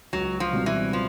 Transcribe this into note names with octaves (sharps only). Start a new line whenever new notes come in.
C#2 F#3
F3
B2 G3 C4
E3
F3